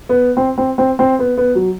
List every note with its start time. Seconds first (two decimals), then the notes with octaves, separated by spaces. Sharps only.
0.09 B3
0.37 C4
0.58 C4
0.78 C4
0.99 C4
1.19 B3
1.38 B3
1.55 F#3